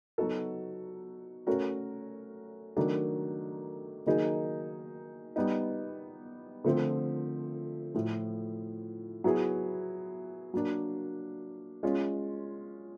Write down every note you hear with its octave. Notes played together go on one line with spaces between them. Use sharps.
F#3 B3 D#4 F#4 A4
A3 C#4 F#4 A#4
D#3 F#3 A3 D4
D#3 F#3 A#3 D#4 G#4
G3 B3 D#4
D3 F3 A3 C4
A2 F3 A3
F#3 B3 E4 G#4
F#3 A#3 D4
G#3 C#4 F4